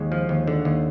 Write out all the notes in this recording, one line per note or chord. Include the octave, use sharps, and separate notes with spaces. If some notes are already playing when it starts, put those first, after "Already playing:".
Already playing: D#2 G#3
F3
D#2
D3
D#2